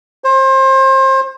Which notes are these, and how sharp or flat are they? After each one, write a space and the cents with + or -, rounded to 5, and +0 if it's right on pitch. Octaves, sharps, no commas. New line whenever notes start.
C5 +30